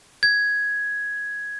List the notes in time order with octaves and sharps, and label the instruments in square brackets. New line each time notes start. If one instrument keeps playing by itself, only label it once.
[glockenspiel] G#6